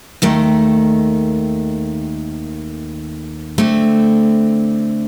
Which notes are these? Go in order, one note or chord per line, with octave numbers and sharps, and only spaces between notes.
D#2 D#3 A3
D3 A3 C4